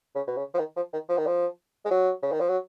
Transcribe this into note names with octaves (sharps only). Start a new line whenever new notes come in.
C#3
B2
C#3
F3
D#3
F3
D#3
F3
D#3
F3
G#3
F#3
C#3
D#3
F3
F#3